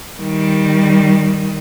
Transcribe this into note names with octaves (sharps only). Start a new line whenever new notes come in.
D#3 G3